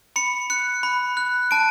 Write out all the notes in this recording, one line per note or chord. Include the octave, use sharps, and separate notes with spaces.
B5 C#7
F#6 C#7
B5
F#6
A5 D7